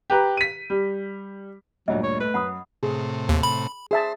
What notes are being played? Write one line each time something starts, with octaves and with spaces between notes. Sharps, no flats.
G4 B4 A#5
B6 D#7
G3
D2 G2 A#2 F#3 D#5
C#5
A3 B4
F#2 F#5 B5 D#6
A2 C3 G#4
D#2
B5
G#4 C5 E5 A5